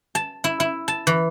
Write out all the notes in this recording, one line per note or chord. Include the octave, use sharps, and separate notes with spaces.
A5
E4
E4
A5
E3